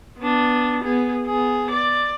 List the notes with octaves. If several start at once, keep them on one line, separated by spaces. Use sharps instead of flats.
B3 D4
B3 G#4
B3 G#4
D5